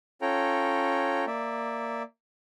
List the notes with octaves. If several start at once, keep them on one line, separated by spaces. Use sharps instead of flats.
C#4 F4 A4 C#5 G5 A#5
A#3 D5 E5